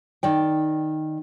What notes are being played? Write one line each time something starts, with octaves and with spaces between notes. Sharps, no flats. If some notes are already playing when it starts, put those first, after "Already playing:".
D#3 D5 G5